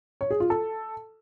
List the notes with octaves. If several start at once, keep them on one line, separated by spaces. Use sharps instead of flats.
C#5
G#4
F4
A4